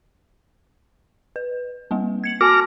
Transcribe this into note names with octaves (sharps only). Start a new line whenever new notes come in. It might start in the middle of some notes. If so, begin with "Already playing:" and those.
B4
G3 A#3 C4
G#6 C#7 F#7
F#4 G#5 A5 D6 F6 A#6